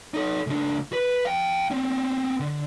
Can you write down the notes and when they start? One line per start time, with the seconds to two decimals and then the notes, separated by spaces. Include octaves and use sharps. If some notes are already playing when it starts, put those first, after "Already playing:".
0.14 D#4 A4
0.47 C#2 D4
0.93 B4
1.25 F5 G5
1.71 C4 C#4
2.40 D3